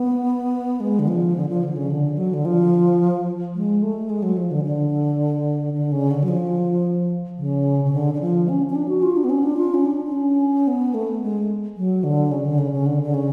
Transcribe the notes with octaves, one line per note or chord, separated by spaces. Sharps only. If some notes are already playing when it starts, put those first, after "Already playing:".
Already playing: B3
G#3
D3
F3
D3
F3
D3
C#3
D3
F#3
D3
F3
G#3
A3
G#3
F#3
F3
D3
D3
D3
C#3
D3
F#3
F3
C#3
C#3
D3
D3
F3
C#4
C#4
D4
F#4
F4
D4
B3
C#4
D4
F4
C#4
D4
D4
C#4
B3
A3
G#3
F#3
D3
C#3
D3
C#3
C#3
D3
D3
C#3